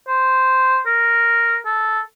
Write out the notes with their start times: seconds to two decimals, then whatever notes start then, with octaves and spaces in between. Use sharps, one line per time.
0.08 C5
0.86 A#4
1.65 A4